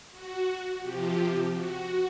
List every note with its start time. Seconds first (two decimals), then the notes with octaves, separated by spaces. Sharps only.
0.11 F#4
0.82 C3 F3 G4
1.53 F#4